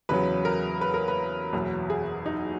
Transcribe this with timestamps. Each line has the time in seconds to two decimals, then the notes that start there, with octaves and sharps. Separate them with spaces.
0.09 E2 C#3 F#3 B4
0.45 A#4
0.81 B4
0.94 A#4
1.08 B4
1.53 F#1 E2 B2 F#3
1.90 G#4
2.26 D#4